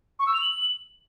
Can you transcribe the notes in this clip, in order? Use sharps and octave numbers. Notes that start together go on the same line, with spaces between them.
C#6
E6
F7
F#7